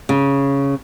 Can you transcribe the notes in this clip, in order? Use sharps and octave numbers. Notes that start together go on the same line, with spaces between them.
C#3